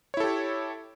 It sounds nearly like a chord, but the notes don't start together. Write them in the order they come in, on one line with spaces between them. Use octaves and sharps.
C#5 E4 A4 G4